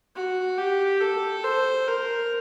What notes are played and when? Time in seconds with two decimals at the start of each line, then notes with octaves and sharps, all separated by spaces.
0.16 F#4
0.58 G4
1.01 A4
1.44 C5
1.88 A#4